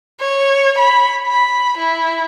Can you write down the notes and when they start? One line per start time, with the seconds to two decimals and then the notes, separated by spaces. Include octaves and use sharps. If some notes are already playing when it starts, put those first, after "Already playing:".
0.21 C#5
0.78 B5
1.28 B5
1.78 E4